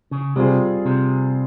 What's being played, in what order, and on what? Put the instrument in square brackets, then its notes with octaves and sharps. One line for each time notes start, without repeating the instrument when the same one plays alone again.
[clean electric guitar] C#3
[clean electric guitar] C3 [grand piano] G3 C4 F4 G#4
[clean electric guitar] C3